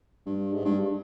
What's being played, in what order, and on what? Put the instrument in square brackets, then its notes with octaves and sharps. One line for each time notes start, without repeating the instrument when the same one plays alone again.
[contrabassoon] G2
G#2
G2